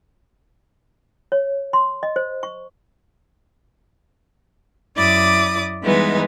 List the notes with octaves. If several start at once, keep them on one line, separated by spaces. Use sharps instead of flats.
C#5
C6
D#5
C5
C#6
F#2 E4 D5 D6 D#6
E3 G3 G#3 B3 D#4